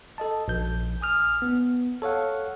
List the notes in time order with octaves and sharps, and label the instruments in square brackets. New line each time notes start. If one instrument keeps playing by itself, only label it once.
[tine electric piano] A4 D#5 A5
A#1 G6
G#5 D#6 F6
B3
A4 C#5 F5 F#5